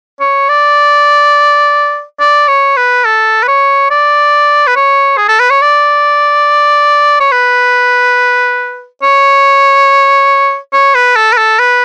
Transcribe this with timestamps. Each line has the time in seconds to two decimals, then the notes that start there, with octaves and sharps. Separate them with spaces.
0.20 C#5
0.49 D5
2.20 D5
2.48 C#5
2.77 B4
3.05 A4
3.43 B4
3.48 C#5
3.90 D5
4.67 B4
4.76 C#5
5.17 G#4
5.28 A4
5.40 B4
5.50 C#5
5.62 D5
7.20 C#5
7.32 B4
9.03 C#5
10.73 C#5
10.95 B4
11.16 A4
11.33 B4
11.37 A4
11.59 B4